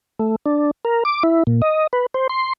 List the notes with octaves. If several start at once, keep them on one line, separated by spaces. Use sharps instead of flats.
A3
D4
A#4
D6
E4
A#2
D#5
B4
C5
C6